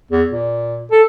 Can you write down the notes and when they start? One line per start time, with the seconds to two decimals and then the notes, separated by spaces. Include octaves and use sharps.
0.11 E2
0.31 A#2
0.91 A4